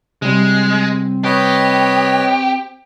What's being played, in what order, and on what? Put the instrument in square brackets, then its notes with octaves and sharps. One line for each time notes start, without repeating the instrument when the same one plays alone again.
[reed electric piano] C3 G3 [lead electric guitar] G#3 [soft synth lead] C4
[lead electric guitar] G4 [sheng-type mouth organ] B4 C#5 D#5